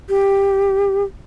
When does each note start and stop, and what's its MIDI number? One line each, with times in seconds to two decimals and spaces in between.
0.09 1.03 67